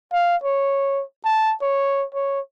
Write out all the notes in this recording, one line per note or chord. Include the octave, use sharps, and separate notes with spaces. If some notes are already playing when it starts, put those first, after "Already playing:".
F5
C#5
A5
C#5
C#5